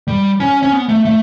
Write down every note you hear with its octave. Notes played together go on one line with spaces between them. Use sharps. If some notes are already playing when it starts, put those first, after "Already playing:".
G3
C#4
C#4
B3
A3
A3